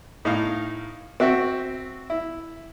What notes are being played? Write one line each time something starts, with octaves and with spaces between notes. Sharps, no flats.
A2 D#4 F5
C4 F#4 E5 G5 C#6
E4